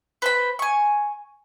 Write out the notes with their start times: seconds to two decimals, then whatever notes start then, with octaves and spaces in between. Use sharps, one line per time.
0.22 B4 C5 B5
0.59 G#5 C#6